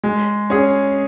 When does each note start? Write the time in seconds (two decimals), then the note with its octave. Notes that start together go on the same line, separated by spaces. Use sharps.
0.04 G#3
0.50 C#4 G#4